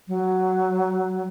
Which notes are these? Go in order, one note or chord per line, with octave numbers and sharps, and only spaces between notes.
F#3